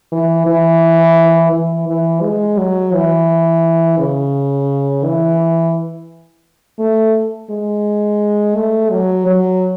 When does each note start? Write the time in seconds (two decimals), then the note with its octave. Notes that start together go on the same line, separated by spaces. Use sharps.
0.12 E3
0.47 E3
1.53 E3
1.88 E3
2.22 G#3
2.58 F#3
2.94 E3
3.99 C#3
5.05 E3
6.79 A3
7.51 G#3
8.56 A3
8.91 F#3
9.26 F#3